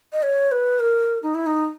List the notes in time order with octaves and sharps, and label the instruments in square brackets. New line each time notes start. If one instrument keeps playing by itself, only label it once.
[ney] D#5
C#5
B4
A#4
D#4
E4
D#4